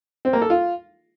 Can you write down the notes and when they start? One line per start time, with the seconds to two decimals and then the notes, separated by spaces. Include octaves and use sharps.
0.25 C4
0.33 A#3
0.42 A4
0.50 F4